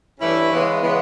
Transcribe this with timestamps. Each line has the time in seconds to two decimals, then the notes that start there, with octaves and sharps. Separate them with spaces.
0.20 G2 E3 A3 C#4 E4
0.52 C#3 E3 G#3 B3
0.82 C#3 E3 G#3 B3